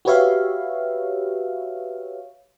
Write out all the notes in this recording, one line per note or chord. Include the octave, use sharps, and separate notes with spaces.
F#4 G4 B4 C#5 E5 F5